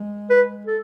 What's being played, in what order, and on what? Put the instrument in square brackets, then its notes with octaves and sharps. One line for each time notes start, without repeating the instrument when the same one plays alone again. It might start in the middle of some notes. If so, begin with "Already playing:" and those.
Already playing: [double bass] G#3
[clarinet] B4
A4